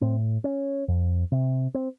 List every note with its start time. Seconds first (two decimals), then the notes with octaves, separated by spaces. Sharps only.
0.01 A2 C4
0.44 C#4
0.88 F2
1.32 C3
1.75 C4